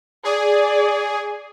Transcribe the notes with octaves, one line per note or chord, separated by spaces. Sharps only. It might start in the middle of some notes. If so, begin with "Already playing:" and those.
G#4 D5